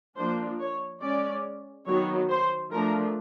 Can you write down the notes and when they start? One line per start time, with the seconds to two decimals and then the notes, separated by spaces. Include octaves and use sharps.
0.17 F3 A#3 D4 C5
0.60 C#5
1.02 G#3 C#4 D5
1.87 D#3 F#3 B3 C#5
2.30 C5
2.72 F3 A3 D4 A#4